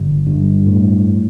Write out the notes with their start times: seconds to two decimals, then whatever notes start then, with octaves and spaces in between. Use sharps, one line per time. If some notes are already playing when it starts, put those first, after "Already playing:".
Already playing: G1
0.26 G2
0.66 A2